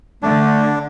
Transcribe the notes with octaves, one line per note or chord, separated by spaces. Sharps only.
D3 A3 D4